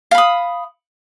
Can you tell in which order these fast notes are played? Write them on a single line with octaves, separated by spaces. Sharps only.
F5 B5 D#6